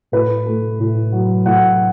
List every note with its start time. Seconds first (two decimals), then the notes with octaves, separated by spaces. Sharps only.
0.12 A2 B4
0.46 A3
0.79 A2
1.12 F#3
1.45 A2 F#5